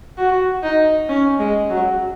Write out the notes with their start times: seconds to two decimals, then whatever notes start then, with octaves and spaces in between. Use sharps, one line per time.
0.18 F#4
0.63 D#4
1.09 C#4
1.39 G#3
1.70 F#3